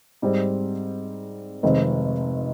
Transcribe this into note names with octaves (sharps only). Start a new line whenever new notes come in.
G#2 G3 C4
F1 F2 D#3 G#3 C4